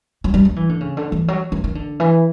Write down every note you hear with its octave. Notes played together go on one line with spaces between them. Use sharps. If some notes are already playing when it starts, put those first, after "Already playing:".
F#3
G3
F#3
E3
D3
C#3
D3
E3
F#3
E3
D#3
D3
E3